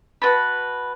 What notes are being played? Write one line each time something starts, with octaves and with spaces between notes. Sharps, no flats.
F#4 B4 A5 B5